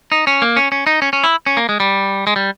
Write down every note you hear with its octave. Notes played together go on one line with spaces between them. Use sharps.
D#4
C#4
A#3
C#4
C#4
D#4
C#4
C#4
E4
C#4
A#3
G#3
G3
G#3
G3